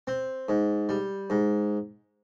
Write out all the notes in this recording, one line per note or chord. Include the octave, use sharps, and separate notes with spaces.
C4
G#2
G3
G#2